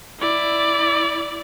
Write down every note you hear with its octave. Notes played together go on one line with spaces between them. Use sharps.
E4 D5